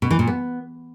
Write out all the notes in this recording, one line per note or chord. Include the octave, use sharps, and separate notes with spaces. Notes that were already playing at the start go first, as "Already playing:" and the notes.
B2
E3
A#2
B3